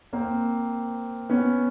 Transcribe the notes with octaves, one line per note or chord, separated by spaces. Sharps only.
A#3 C4
B3 C#4